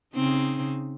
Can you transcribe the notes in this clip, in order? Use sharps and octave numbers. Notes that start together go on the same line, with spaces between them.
C#3 C4 D#4